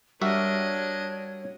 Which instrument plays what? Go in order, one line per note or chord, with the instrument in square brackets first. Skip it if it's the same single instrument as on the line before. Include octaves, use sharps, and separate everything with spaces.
[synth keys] G3 [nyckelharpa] D4 D#5 [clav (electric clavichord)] F#4 A#4 E5 [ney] C#5